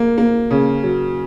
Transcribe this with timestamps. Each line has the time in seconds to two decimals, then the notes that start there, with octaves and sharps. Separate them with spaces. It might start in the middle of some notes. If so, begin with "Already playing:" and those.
Already playing: A#3
0.18 A#3
0.51 C#3
0.83 F#3